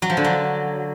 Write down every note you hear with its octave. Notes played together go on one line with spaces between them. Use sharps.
F#3
F3
D3
F#3